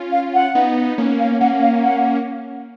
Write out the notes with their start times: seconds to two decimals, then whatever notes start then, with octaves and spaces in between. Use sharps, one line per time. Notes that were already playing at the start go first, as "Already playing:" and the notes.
Already playing: C#4 F4
0.12 F5
0.34 F#5
0.55 B3 D#4
0.98 A#3 C#4
1.20 F5
1.40 A#3 C#4 F#5
1.62 F5
1.83 F#5